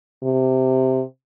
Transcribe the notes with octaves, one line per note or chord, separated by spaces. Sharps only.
C3